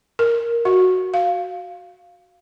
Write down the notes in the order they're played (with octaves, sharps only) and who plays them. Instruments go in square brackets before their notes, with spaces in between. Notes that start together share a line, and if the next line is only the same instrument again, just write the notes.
[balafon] A#4
F#4
F5